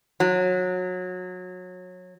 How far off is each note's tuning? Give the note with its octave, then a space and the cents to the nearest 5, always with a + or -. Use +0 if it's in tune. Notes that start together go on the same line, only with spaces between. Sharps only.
F#3 -25